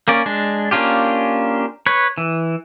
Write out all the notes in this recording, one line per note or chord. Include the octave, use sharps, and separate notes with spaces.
A#3 C#4 D5
G#3 D4
A#3 C#4 D4 F4 G4
B4 C#5
E3